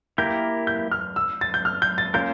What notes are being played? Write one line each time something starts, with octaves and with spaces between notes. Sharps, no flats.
A#3 E4 G4 A#4 G6
G6
F6
E6
A6
G6
F6
G6
A6
A#3 C#4 F4 A#4 G6